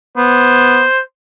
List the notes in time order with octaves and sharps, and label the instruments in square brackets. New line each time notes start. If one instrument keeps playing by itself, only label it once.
[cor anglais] B3 [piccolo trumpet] C5